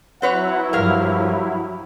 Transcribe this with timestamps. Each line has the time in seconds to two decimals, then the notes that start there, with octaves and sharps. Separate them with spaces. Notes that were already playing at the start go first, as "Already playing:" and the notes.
0.22 F#3 C4 E4 B4 C#5 F#5
0.73 G2 F3 G4 A#4 F5